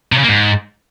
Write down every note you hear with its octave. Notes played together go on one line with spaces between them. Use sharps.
C3
C#3
A#3
G#2